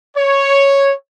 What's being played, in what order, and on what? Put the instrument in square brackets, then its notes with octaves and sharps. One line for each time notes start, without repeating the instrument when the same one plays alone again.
[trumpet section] C#5